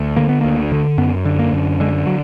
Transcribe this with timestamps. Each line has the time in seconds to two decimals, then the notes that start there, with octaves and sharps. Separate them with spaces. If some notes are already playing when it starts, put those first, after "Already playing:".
Already playing: D2
0.16 D3 A#3
0.29 B3
0.41 D2 A#3
0.72 D3
0.98 F#2 B3
1.25 D3
1.39 A#3
1.53 F#2
1.80 D3 G#3
2.07 F#3